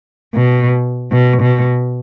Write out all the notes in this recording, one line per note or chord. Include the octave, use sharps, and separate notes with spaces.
B2
B2
B2